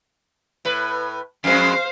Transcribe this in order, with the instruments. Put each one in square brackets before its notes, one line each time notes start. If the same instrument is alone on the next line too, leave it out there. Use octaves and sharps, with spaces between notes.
[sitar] A2 B4
[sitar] F2 G#3 [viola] C5 F5